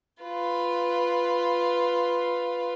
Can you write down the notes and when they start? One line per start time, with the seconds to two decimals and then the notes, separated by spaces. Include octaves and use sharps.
0.23 F4 B4